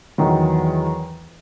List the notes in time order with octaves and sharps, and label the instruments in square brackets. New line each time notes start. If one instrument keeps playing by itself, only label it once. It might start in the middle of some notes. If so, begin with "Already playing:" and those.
[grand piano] E2 D#3 F#3